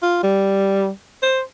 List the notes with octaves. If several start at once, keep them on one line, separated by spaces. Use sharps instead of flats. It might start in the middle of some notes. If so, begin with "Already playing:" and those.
F4
G3
C5